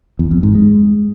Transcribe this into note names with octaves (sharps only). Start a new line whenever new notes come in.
E2
F2
G#2
G#3